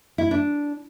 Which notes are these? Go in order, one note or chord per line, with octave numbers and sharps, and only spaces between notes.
E4
D4